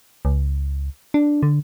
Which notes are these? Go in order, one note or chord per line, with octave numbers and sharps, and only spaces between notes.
C#2
D4
D3